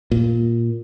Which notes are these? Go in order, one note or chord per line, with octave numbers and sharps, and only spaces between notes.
A#2